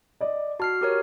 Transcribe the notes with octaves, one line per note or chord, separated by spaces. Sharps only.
D5 D#5
F#4 A5 F6 C7
G4 A#4 C#5